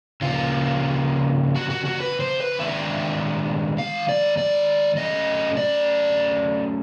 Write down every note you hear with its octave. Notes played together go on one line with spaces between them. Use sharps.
C#3 F3 A#3 F4
F#4
F#4
F#4
B4
C5
B4
D#3 G#3 B3 D4 F4 E5
F5
D5
D5
F#3 A3 C#4 D#5
D5